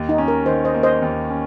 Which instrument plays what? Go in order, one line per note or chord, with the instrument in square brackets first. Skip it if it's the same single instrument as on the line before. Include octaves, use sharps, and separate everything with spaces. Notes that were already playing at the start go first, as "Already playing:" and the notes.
Already playing: [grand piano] D#2
[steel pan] D#4
[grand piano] C#4
[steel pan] A#4
[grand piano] D#3 [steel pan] C5
[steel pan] C5 D#5
[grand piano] A#3
[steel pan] C5 D#5
[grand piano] D#2
C#4